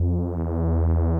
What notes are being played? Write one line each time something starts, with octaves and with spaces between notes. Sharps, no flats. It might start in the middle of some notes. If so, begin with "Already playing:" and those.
Already playing: F2
E2